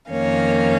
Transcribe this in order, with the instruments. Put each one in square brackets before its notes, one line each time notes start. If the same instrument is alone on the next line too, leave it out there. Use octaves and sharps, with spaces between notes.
[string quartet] F2 D#3 A#3 C#4 C#5 F5